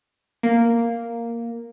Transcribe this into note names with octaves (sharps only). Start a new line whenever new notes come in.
A#3